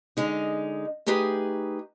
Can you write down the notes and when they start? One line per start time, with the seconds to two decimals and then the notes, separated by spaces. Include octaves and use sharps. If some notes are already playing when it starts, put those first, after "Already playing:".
0.17 D3 G#3 D#4
1.07 A3 D#4 G4 G#4 B4